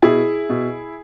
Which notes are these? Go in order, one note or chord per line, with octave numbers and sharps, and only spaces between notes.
B2 E4 G#4
B2